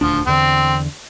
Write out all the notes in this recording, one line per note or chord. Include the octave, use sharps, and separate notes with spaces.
D#1 D2 F3 D4
E2 D3 C4